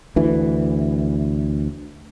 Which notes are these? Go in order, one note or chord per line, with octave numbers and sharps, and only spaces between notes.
D2 E3